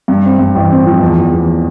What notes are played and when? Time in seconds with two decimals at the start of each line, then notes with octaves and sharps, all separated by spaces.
0.08 G2
0.24 C4
0.39 G2
0.55 A1
0.71 C4
0.86 F3
1.01 E2
1.17 E2
1.32 E2